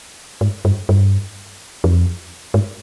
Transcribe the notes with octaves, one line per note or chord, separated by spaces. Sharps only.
G#2
G2
G2
F2
G#2